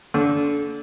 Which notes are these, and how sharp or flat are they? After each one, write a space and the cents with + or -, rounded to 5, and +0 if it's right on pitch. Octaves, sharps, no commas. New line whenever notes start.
D3 -30